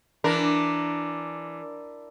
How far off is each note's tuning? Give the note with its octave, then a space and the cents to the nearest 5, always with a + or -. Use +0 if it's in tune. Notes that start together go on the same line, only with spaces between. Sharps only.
E3 +15 D4 +0 A#4 +0